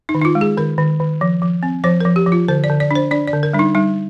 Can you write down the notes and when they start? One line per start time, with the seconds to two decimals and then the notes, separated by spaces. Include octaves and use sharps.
0.09 D#4
0.15 D#3
0.21 D#4
0.25 F4
0.35 G#3
0.41 G#4
0.58 D#3 A#4
0.78 D#3
1.00 D#3
1.21 F3
1.42 F3
1.63 C4
1.84 F3 C5
2.00 A#4
2.05 F3
2.16 G4
2.26 F3
2.32 F4
2.48 D3 C5
2.64 D5
2.70 D3
2.80 D5
2.91 D4 C5
3.11 D4 D5
3.28 D5
3.33 D3
3.43 A#4
3.53 G3 D4
3.59 D#4
3.75 G3 D#4